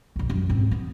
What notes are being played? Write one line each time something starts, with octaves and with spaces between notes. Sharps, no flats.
B1 E2
F#2
G#2 C4
B3